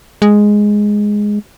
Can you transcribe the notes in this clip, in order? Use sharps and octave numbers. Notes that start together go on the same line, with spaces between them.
G#3